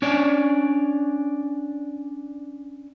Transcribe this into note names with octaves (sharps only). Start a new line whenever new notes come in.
C#4 D4 C#5 D5